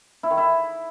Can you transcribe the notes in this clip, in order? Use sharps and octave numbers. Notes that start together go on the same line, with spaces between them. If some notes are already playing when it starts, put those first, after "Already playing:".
E4
D#3
E4